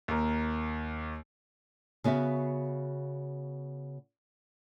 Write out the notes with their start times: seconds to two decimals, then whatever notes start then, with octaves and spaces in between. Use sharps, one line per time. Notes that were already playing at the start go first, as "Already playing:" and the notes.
0.08 D#2 A#4
2.04 C#3 B3 F#4 E5 F5